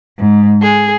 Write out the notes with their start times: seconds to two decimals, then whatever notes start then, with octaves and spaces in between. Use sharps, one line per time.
0.20 G#2
0.63 G#4